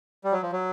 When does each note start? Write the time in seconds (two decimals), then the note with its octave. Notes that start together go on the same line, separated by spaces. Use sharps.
0.24 G3
0.32 F#3
0.42 F3
0.52 F#3